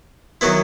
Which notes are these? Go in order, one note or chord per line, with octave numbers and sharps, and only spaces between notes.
D#3 F#3 B3 E4